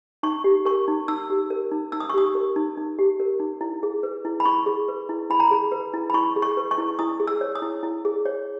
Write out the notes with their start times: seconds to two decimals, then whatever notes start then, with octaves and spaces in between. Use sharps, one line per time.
0.23 D#4 C#6
0.44 G4
0.65 A#4 C#6
0.88 D#4
1.08 D#4 E6
1.30 G4
1.50 A#4
1.71 D#4
1.92 D#4 E6
2.00 D#6
2.10 C#6
2.14 G4 D#6
2.35 A#4
2.56 D#4
2.77 D#4
2.99 G4
3.20 A#4
3.40 D#4
3.61 E4
3.83 G#4
4.03 B4
4.25 E4
4.40 B5
4.45 E4 C#6
4.66 G#4
4.88 B4
5.09 E4
5.30 E4 B5
5.40 A#5
5.48 G#4 B5
5.72 B4
5.94 E4
6.10 B5
6.14 E4 C#6
6.36 G#4
6.42 C#6
6.57 B4
6.71 C#6
6.78 E4
6.99 E4 D#6
7.20 G#4
7.27 E6
7.41 C#5
7.55 D#6
7.62 E4
7.83 E4
8.05 G#4
8.25 C#5